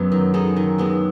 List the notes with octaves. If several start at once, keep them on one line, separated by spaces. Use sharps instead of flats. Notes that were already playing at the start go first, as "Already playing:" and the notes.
Already playing: F#2 F#3 B3 G#4
D#3
G#3 D#4 A4
D#3
G#3 B3 F#4